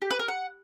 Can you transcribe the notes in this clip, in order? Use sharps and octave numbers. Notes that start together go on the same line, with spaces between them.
G4
B4
A#4
F#5